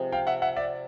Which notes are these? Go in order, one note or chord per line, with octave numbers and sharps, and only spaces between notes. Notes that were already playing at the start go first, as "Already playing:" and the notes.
Already playing: C3 F3 G#3
F5 G5
E5 F#5
E5 F#5
D5 E5